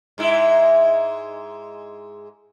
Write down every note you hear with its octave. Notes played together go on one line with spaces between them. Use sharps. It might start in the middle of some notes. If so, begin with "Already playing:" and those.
G#2 G#3 E4